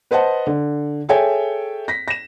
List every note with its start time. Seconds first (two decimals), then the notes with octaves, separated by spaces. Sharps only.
0.11 B4 C5 D#5 F#5 A5
0.47 D3
1.09 G#4 A4 C#5 E5 G5 G#5
1.88 A#6 B6
2.08 A#6 E7